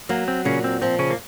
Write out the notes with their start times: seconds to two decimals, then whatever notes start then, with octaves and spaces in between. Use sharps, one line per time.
0.09 F#3 A#3
0.28 C4
0.45 A#2 C#3 C#4
0.64 C4
0.82 F3 C4
0.99 C#3 C#4
1.10 A#3